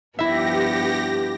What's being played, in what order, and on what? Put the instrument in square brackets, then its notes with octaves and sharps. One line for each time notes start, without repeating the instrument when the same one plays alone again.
[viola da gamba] G2 F3 B3 [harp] E4 E5 [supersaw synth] G4 A#6